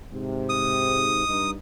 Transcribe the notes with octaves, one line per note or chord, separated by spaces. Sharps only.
G#2 C3
D#6
G2 D#4